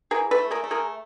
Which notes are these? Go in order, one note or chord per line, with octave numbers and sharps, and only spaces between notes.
E3 G#4 A#4
A4 B4
A3
G#4 A#4
A3
G#4 A#4